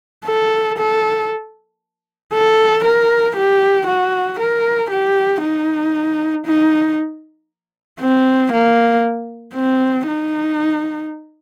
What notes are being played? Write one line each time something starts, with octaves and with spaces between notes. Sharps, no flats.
A4
A4
A4
A#4
G4
F#4
A#4
G4
D#4
D#4
C4
A#3
C4
D#4